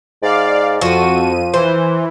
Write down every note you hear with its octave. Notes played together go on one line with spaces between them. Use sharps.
G#2 D5 F5
F2 F3 F#4 A4 D#7
E3 C5